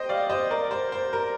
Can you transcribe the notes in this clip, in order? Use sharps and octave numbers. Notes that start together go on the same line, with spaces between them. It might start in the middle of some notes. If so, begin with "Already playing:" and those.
Already playing: C5 D#5 G5
D5 F5
C5 D#5
A#4 D5
C5
C5
A#4